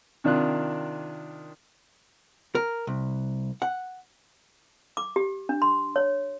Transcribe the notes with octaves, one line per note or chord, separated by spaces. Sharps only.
C3 D#3 D4 F4 F#6
A#4
C2
F#5
D6
G4
D4
C6
C#5